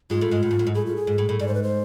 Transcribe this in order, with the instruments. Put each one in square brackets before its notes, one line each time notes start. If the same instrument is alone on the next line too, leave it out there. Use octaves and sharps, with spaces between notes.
[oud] G#2 G#3 [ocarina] F4
[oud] A2 A3
G#2 G#3
A2
G#2
A2
G#2
[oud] A2 [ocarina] G#4
[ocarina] F4
G#4
[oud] G#2
A2
A2
[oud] G#2 [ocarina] D5
[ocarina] C5
B4
C5